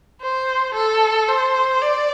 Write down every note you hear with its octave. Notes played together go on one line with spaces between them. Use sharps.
C5
A4
C5
D5